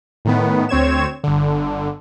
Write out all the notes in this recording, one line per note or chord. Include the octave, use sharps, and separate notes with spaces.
A2 D#3 B3
D2 C4 C#5 G#6 E7
G1 D3